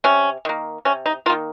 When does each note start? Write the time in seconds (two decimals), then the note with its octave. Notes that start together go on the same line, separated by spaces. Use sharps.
0.04 C3 C#4
0.45 D#3 A#3
0.85 C3 C#4
1.06 D#4
1.26 A#3 F4
1.30 D#3